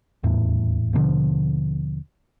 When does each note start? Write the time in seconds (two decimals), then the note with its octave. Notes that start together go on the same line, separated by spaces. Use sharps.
0.23 D#1 E2 A2
0.93 D#2 B2 D3 F3